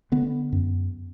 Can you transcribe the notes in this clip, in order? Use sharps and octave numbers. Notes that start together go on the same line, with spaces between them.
D3 B3
F#2